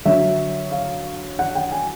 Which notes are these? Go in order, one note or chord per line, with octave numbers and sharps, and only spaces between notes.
D3 F#3 E5
F5
F#5
G5
G#5